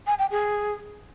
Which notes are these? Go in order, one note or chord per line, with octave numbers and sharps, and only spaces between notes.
G#5
G5
G#4